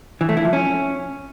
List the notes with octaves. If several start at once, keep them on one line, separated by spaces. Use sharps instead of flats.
E3
A3
E4
F3
C#4